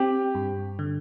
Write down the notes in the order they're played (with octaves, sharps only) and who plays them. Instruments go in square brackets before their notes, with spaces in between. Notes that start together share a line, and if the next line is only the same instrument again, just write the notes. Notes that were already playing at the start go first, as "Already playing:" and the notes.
Already playing: [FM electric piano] C4 [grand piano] G4
[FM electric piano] G2
D3